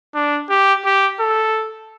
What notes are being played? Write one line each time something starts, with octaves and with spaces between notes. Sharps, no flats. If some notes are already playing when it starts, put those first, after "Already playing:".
D4
G4
G4
A4